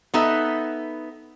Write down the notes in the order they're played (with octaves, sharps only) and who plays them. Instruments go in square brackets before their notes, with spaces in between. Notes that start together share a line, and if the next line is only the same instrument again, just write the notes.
[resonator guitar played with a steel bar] B3 D#4 A4 E5